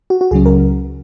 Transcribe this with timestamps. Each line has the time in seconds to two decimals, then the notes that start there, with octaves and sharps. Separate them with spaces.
0.10 F#4
0.21 F#4
0.31 C#2 C#3 F#3 C#4 G#4
0.46 A#4